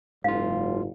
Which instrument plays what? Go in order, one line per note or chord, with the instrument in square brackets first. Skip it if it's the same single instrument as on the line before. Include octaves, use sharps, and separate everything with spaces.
[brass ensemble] F#1 [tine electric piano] G#2 F4 [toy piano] F5